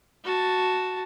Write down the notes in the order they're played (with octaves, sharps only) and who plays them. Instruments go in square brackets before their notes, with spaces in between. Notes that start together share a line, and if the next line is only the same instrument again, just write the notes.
[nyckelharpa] F#4 A5